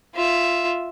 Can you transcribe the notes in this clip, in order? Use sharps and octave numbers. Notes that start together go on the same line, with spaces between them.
F4 E5